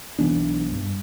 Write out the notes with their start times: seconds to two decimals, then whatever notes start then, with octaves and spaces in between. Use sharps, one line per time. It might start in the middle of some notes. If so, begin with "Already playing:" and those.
0.19 B1 E3 B3 D4
0.72 G2